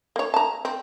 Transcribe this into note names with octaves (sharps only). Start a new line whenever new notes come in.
A#3 C#5
A5 A#5
C4